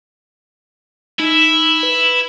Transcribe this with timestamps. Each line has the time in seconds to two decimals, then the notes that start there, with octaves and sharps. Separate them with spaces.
1.20 D#4 E4
1.83 B4